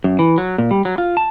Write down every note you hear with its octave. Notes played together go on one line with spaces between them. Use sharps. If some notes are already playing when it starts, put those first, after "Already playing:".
F#2
E3
F#3
A#2
G3
F#3
F4
A5